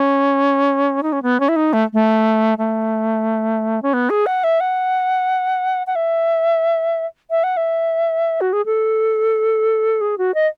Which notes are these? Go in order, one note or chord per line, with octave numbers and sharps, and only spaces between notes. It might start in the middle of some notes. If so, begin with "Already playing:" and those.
Already playing: C#4
D#4
C#4
B3
C#4
E4
D#4
A3
A3
A3
C#4
B3
G#4
F#5
E5
F#5
F#5
E5
E5
F#5
E5
F#4
G#4
A4
G#4
F#4
D#5